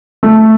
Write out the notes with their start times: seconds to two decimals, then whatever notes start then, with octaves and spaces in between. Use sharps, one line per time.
0.23 A3